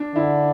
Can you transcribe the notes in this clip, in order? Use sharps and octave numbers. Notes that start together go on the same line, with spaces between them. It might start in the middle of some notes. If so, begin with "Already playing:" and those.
Already playing: D4
D3 E4